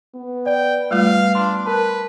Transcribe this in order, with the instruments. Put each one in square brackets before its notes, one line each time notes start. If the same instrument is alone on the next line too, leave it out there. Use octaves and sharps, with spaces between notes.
[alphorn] B3
[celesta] D5 [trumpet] G5
[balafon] G3 A3 F4 [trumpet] F5
[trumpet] D4 [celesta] C6
[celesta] A#4 A5 [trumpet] B4